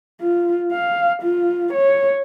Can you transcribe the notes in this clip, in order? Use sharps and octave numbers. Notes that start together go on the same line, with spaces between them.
F4
F5
F4
C#5